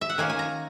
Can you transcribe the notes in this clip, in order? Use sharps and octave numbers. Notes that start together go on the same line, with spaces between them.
E5
F#5
D#3 A#3 C#4 G#5
G#5
A#5